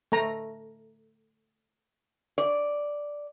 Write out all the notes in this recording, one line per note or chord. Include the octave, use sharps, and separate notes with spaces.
A3 A#5
D5